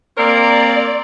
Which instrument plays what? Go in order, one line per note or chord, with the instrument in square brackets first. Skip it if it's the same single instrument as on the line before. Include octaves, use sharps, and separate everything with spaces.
[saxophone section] A#3 C4 A#4 [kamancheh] D5